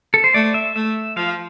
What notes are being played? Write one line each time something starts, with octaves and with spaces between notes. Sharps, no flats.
A4
C5
A3 D5
E5
A3 E5
F3 F5